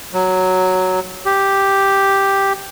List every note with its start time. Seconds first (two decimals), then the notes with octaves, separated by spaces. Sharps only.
0.13 F#3
1.25 G4